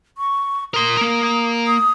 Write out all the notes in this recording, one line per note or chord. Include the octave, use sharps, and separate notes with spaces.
C#6
A#4 C6 D#6
A#3 A#4
D#6